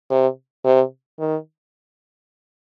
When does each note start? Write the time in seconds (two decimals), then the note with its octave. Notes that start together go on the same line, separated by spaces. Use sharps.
0.11 C3
0.65 C3
1.19 D#3